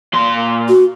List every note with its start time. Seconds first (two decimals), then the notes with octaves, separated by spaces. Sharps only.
0.14 A#2 C6
0.68 F#4